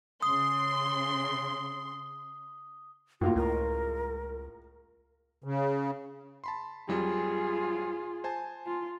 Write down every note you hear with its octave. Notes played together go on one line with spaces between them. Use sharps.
C#3 C6 D#6
F#2 A2 A#3 F4 F#4
C#2 A#4
C#3
A5 B5 C6
F2 F#3 G3 F4 G#4
C5 G#5 A5
F4